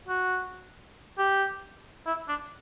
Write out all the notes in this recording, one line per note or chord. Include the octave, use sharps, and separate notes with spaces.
F#4
G4
E4
D4